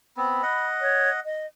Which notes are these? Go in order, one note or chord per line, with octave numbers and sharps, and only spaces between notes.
B3 C4 B5
D#5 F#5
C#5
D#5